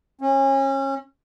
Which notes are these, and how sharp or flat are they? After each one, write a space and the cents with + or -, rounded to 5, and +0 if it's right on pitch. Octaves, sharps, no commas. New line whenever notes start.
C#4 -30